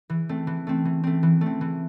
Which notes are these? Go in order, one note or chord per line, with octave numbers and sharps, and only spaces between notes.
E3
A3 C4
E3
A3 C4
E3
A3 C4
E3
A3 C4
E3